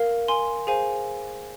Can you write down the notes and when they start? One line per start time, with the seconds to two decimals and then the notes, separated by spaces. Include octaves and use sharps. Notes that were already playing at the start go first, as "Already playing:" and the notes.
Already playing: A#4 F5
0.28 G#5 C6
0.67 G#4 C5 F5 G#5